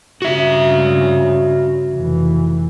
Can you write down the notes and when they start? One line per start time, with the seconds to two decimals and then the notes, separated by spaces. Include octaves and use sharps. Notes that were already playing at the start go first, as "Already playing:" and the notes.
0.22 G2 C#3 F#4 E5
1.91 F1 E3